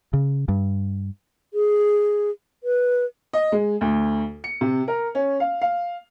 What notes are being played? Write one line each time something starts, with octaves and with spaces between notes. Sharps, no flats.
C#3
G2
G#4
B4
D#5
G#3
D2
C#7
C3
A#4
C#4
F5
F5